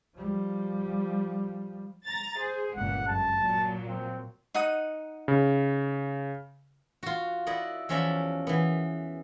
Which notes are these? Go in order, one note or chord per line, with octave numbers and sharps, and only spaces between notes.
F3 G3
A#5 A6
G#4 C5
G1 C#2 A#2 F#5
F#2 A5
A#2 F#3
C4
D#4 F#5 D#6
C#3
F4 F#4
E4 D5 D#5 F#5
E2 F3 C#4 F#4 D5 E5
E3 B3